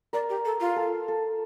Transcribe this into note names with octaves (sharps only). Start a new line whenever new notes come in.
A#4 D5
G4
A4
F4
A4
A4